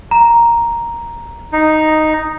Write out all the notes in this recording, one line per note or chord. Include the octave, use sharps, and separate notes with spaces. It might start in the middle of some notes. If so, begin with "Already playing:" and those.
A#5
D#4